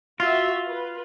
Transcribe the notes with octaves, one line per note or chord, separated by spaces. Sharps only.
F4 F#4 E5
B4